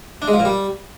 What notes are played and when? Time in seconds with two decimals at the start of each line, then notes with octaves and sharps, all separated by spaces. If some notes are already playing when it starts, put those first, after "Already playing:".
0.22 D4
0.28 G#3
0.34 F3
0.39 A#2
0.45 G3